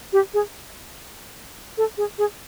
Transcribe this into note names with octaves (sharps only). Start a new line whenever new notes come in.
G4
G#4
A4
G#4
G#4